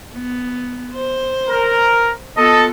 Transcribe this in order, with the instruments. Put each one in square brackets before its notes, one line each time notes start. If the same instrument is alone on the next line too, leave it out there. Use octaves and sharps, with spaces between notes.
[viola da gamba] B3
C5
[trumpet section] A#4
[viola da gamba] B3 F4 [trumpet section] A4 [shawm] D#5